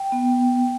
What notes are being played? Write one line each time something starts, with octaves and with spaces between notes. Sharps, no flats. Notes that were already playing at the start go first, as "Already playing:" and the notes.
Already playing: G5
B3